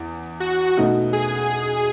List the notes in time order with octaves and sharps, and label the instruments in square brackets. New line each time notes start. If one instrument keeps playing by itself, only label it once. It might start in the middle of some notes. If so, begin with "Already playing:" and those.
Already playing: [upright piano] E2
[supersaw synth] F#4
[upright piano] B2 A3 D#4 F#4
[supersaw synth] G#4